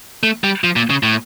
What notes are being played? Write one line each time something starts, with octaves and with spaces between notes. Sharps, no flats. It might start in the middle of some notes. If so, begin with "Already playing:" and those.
A3
G3
F3
A#2
C#3
A2